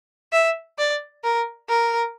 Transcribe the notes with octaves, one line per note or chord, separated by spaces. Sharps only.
E5
D5
A#4
A#4